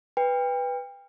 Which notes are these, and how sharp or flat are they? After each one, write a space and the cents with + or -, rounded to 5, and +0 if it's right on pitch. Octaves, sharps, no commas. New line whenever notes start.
B4 +0 G5 +30